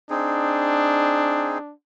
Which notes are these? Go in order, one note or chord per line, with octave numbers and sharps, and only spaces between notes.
C4 D4 D#4 G#4